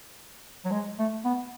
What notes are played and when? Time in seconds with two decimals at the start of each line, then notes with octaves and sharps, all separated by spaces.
0.65 F#3
0.71 G#3
0.99 A3
1.25 B3